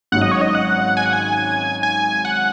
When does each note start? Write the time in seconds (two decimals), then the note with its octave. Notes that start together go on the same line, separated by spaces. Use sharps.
0.12 G#1 G#2 F#3 C#4 F#5
0.22 D#5
0.31 C#5
0.41 D#5
0.55 F#5
0.97 G#5
1.06 F#5
1.13 G#5
1.83 G#5
2.25 F#5